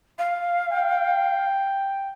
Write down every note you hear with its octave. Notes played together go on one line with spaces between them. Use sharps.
F5
G5